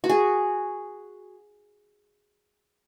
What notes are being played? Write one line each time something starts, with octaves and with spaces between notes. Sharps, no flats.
F#4
G#4